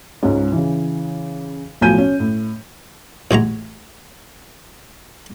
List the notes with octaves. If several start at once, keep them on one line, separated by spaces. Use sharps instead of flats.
C#2 G#2 C#4
C#3 E3
B1 A2 F3 G#5 G6 D#7
C#4
A2
A1 G#3 F#4 A#5